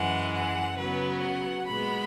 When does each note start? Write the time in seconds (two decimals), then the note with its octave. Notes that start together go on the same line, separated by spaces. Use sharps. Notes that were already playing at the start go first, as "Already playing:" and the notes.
Already playing: F#2 E3 G#3 F#5
0.33 F#5
0.77 C#3 F#3 B3 B4
1.22 F#5
1.66 A#2 G#3 B3 B5